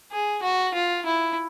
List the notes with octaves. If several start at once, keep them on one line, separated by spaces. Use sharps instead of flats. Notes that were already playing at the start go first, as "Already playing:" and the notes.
G#4
F#4
F4
E4